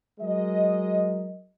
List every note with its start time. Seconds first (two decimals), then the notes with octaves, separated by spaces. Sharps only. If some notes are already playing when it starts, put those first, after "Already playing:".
0.20 F#3 G#3 A#4 D#5